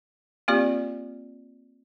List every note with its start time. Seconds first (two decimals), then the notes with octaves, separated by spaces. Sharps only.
0.48 A#3 C4 F4 G4 D5